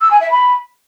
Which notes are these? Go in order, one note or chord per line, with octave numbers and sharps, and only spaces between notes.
E6
G#5
E5
B5